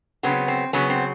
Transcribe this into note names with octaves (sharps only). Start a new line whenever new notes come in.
C#3 F#3 B3 C4
C4
C#3 F#3 B3 C#4
C4